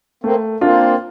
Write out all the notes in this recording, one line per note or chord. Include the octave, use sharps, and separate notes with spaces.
A3 A#3 C4
A#3 C4 D4 F4